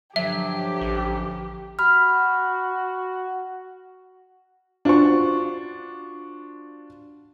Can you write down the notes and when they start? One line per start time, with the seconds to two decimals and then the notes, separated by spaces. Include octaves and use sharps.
0.16 G2 D3 F3 F#3 G4 E5
0.81 A1
1.79 F#4 B5 F6
4.85 D4 F4 F#4 C5 C#6